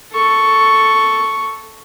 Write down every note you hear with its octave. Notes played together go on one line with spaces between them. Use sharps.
A4 C#6